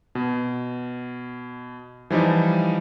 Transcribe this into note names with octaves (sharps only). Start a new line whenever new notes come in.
B2
E3 F3 G3 D#4 D#5